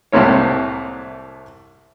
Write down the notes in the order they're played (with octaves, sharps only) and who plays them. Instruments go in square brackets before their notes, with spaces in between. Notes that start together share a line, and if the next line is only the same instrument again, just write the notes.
[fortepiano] C2 A2 C3 A#3 C#5